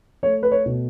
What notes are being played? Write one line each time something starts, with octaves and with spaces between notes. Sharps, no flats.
A3 C#5
B4
C#5
B2